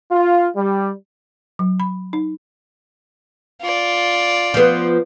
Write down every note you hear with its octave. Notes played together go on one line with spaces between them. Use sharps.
F4
G3
F#3
B5
D#4
F4 D5
F3 B3